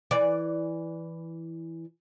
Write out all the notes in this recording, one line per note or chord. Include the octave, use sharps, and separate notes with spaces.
E3 D5